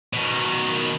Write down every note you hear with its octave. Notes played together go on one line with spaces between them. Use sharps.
B2 D#3